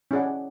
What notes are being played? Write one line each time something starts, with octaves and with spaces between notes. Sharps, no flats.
C#4 E4 G#4 D5 F#5